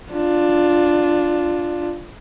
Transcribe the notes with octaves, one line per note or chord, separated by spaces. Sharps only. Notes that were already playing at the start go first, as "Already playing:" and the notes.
D4 F4